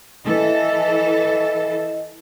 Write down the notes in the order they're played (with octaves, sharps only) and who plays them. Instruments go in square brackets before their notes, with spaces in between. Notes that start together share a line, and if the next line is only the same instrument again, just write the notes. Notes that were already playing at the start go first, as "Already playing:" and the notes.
[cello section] E3 A4 [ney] D#5